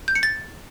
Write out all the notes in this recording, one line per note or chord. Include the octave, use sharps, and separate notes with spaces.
G6
C#7
A6